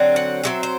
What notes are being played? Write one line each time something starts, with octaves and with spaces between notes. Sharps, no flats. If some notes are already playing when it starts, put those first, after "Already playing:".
Already playing: D3 F#3 C4
F#5
D3 F#3 C4 E5
C5